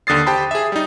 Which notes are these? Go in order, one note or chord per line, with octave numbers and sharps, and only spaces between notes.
D#2 D3 D#6 A6 C7
G4 C5 G5 A5 B5
G#4 E5
G3 D#4